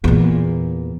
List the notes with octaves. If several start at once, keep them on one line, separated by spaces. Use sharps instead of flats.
E2 A#2